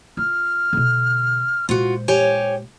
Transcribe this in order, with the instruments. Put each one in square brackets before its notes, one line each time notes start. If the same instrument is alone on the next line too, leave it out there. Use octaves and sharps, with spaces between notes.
[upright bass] F4 [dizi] F6
[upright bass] B2 D3
[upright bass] A#2 G#3 [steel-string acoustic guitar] F4 F#4 [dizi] C5
[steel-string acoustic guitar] G4 C#5 G#5